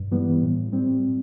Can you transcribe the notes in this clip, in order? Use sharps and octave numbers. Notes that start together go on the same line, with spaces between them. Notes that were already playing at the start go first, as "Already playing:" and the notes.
Already playing: G2
E3 G3 B3
A2
G3 C4